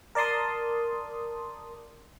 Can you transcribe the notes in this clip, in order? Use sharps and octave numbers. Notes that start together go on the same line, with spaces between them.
A#4 D5 A5 C6 D#6